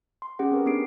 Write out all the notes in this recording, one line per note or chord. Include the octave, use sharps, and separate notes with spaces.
C6
C#4 G4 G#4 F#5
C4 A#4 B4
B3 D4 G4 B4 C7 D7